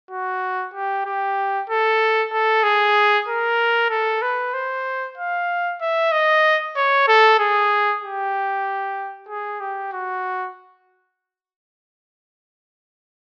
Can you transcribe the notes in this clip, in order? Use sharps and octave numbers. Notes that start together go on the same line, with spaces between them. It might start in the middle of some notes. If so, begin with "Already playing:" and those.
F#4
G4
G4
A4
A4
G#4
A#4
A4
B4
C5
F5
E5
D#5
C#5
A4
G#4
G4
G#4
G4
F#4